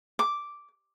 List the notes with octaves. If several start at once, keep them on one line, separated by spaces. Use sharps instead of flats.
D6